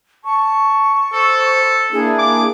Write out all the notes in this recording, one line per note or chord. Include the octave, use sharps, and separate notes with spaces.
A5 C#6
A4 C5
A#3 D4 E4 G#4
D6